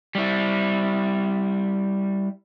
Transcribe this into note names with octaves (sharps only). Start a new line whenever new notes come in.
G3 E4